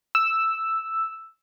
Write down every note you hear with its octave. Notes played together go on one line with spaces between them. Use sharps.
E6